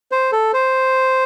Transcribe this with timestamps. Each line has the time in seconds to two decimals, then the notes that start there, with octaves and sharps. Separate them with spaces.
0.12 C5
0.32 A4
0.53 C5